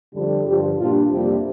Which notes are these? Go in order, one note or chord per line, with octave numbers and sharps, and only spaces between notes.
F2 D3 G3
G2 D3 F3 G4
A#2 G3 D4 F4
F2 C3 G3 A#3 D4 G4